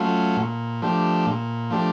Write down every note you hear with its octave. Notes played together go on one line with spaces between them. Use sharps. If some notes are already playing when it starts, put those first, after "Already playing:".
Already playing: F#3 A3 C#4 F4
A#2
F3 A3 D4 G4
A#2
F3 A3 D4 G4